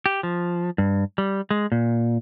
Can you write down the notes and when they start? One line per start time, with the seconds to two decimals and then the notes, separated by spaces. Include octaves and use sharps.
0.06 G4
0.23 F3
0.78 G2
1.18 G3
1.51 G#3
1.72 A#2